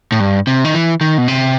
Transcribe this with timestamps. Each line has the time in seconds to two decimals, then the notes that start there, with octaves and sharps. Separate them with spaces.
0.12 A2
0.20 G2
0.47 C3
0.65 D#3
0.74 E3
1.01 D#3
1.18 B2
1.28 C3